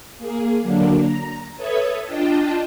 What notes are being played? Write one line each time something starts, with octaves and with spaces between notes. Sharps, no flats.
A#3 G#4
D3 F#3 A#3 D4
A#5
A4 B4 C#5 E5 D#6 G#6
D4 F4 D#5 G5 A5